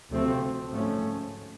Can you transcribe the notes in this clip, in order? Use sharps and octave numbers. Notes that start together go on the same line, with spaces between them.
D2 C3 F3 A3 C4
G#2 F3 A3 C#4